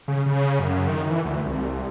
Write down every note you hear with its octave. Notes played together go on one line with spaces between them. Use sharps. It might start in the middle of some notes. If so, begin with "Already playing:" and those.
C#3
C#3
F#2
D#3
E3
D2
C2